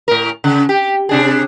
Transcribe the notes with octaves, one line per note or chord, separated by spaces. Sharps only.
A2 A#4
C#3
G4
C3 D4 G#4